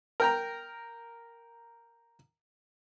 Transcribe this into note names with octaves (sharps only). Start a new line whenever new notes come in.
A#4 G5 A#5